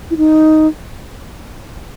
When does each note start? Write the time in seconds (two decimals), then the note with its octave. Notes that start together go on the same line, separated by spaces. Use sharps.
0.11 E4
0.17 D#4